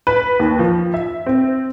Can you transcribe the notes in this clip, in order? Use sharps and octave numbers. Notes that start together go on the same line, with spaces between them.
B4
D#2
F3
E5
C4